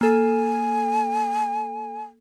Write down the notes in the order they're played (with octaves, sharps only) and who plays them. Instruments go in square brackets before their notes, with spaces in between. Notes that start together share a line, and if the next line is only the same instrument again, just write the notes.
[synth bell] A#3 A4 [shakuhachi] G#5